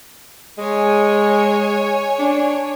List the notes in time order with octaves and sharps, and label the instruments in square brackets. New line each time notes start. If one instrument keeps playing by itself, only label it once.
[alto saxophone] G#3 [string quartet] C#5 G#5
[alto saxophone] D4